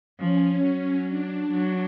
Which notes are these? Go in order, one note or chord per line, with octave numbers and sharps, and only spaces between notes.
F3 C#4
F#3
D4
F#3